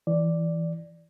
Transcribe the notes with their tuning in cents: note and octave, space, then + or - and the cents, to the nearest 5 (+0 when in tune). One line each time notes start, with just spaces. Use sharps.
E3 +0 D5 +0